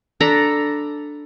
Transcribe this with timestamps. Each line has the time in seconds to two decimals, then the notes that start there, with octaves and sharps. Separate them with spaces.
0.20 D4 A4 A#5 B5